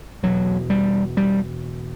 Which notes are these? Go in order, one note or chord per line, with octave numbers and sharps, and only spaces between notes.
E2 B2 F#3
G3
G3